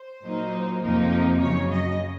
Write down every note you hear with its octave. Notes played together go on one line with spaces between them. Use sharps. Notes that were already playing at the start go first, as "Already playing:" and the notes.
Already playing: C5
A#2 F#3 A#3 D#4
F2 C3 F3 A#3 D#4
F#2 C#3 F#3 C#5
D#5